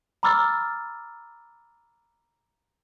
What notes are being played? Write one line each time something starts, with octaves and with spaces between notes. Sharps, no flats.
A#5 B5 D6 E6 F6 A6